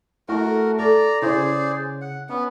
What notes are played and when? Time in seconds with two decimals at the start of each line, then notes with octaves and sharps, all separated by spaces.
0.29 A3 E4 F#4 A#4
0.79 A4 D5 A#5
1.22 C#3 E4 G#4 C5 D5
2.02 F#5
2.29 B3 C#4